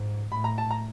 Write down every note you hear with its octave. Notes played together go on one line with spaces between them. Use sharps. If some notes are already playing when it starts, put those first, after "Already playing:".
Already playing: G#2
A2 B5
A#5
A5
A#5